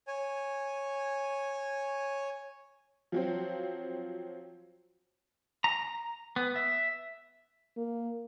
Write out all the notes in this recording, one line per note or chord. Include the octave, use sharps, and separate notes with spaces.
C#5 G#5
F3 F#3 C4
A#5
B3
E5
A#3